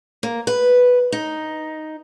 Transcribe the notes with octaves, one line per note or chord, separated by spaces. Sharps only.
A#3
B4
D#4